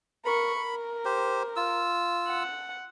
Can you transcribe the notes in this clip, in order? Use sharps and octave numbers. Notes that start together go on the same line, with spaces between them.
A#4 B5 C#6
A#4
G4 C5
F4 E6
F#5